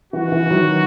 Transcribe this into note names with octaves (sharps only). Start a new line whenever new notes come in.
E3 F#4
E3
D#3 F#3